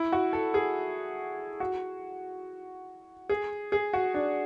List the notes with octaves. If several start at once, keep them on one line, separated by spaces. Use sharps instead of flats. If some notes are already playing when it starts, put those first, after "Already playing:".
Already playing: E4
F#4
A4
G#4
F#4
G#4
G#4
F#4
D4